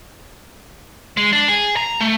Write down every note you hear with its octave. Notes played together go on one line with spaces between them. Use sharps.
G#3
D4
G#4
A#5
A3